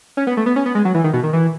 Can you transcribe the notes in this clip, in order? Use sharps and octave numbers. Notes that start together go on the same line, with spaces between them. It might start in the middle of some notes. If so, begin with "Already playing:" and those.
C#4
B3
A3
B3
C#4
B3
G#3
F#3
E3
D#3
B2
D#3
E3